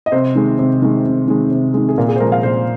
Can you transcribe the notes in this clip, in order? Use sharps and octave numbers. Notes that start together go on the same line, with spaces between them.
D#5
C3 C5
D#3 G#3
C3
D#3 G#3
C3
D#3 G#3
C3
D#3 G#3
G#4
A#2 A#4
G#4
C5
F3 G#3 A#4
F5
A#2 C5